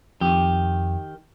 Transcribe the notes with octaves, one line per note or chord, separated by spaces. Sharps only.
F2 D#3 G4